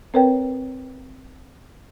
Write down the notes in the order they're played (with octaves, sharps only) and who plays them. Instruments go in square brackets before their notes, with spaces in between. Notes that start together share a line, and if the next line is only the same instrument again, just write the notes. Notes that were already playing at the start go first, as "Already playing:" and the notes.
[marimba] C4 A#4 B4 C#5 G5